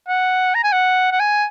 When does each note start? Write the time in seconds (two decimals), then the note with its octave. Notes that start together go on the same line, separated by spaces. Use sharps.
0.08 F#5
0.55 A#5
0.64 G#5
0.73 F#5
1.12 F#5
1.20 G#5